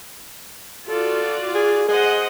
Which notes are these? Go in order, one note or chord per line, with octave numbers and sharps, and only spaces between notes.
F4 F#4 A4 D5
G#4
G#4 C5 D#5 F#5